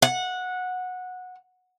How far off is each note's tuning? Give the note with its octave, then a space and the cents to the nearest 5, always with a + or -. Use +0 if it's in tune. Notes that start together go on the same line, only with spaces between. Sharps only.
F#5 -15